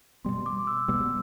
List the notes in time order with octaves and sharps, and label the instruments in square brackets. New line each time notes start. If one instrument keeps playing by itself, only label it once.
[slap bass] B2 G3 B3 [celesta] C6
[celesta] D6
E6
[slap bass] B2 G3 B3 [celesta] E6